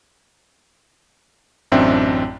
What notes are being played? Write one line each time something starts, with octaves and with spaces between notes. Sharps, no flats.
A1 F#2 C4 D4 E5 G5